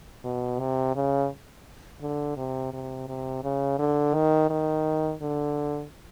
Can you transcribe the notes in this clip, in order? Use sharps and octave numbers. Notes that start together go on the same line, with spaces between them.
B2
C3
C#3
D3
C3
C3
C3
C#3
D3
D#3
D#3
D3